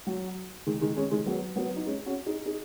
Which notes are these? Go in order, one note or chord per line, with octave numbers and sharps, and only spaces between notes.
F#3
D#3 G#3
D#3 G#3
G#3 C#4
D#3 G#3
F#3 B3
F#3 B3
D#4
G#3 C#4
C#4 F#4
D#4 G#4
D#4 G#4